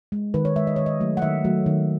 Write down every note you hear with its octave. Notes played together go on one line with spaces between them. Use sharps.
G#3
D#3 B4
C#5
G#3 E5
D#5
D#3 C#5
D#5
F#3 A3
F#5
D#3 E5
F#3 A3
D#3